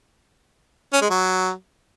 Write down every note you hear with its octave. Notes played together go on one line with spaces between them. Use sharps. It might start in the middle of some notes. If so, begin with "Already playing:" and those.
C#4
G#3
F#3